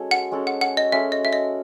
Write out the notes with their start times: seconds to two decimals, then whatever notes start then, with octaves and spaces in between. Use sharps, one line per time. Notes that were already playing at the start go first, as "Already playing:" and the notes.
Already playing: G#3 C#4 F#4 A4
0.11 F#5
0.32 G#3 C#4 F#4 A4
0.47 F#5
0.61 F#5
0.77 D#5
0.92 G#3 C#4 F#4 A4 E5
1.12 D#5
1.25 E5
1.33 D#5